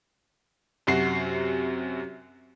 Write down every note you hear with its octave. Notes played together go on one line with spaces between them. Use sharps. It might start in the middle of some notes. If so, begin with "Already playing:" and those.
F#2 C3 F#3 F#4 C7